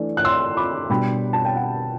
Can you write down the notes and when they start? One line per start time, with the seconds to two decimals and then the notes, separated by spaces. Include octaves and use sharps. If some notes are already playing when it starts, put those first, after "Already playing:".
Already playing: E3 A3 D4
0.17 F#6
0.25 C6 E6
0.57 B5 D6
0.90 B2 G3 D4 G5 B5
1.33 A5
1.45 G5
1.56 F#5